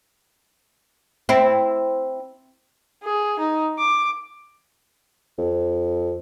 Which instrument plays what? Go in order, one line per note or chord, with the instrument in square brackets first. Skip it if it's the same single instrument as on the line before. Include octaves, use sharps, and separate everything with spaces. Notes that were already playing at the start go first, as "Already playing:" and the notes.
[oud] C4 E4
[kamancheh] G#4
D#4
D6
[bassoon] F2